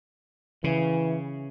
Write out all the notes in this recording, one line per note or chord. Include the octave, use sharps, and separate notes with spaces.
C#3 E3